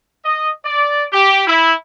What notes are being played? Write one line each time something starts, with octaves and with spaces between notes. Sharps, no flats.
D#5
D5
G4
E4